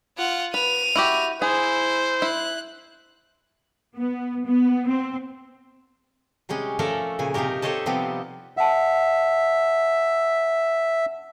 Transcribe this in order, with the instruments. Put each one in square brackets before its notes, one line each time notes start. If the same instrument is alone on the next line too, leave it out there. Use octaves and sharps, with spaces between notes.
[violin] F4 F#5
[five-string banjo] B4 [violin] D#7 F7
[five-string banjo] E4 F#4 G4
[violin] E4 [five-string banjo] G#4 [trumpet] C5
[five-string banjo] E4 [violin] F#6
[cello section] B3
B3
C4
[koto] C3 G3 G#3 C#4
F3 A3 C#4 A4 A#4 D5
A#2 C#3 G#5
C3 F3 D#4 G4 A#4
G4 A4 C5 C#5 D#5 A5
C3 F3 G3 B3 C4
[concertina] E5 [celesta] F#5 A5